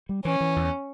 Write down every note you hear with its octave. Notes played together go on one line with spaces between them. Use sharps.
G3
E3 C#4
E3
E2